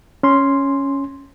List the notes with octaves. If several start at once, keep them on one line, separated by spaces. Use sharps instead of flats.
C#4 C6